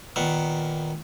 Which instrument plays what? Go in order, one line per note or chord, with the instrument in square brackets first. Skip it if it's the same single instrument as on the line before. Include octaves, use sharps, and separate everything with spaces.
[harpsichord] A#2 D#3 B3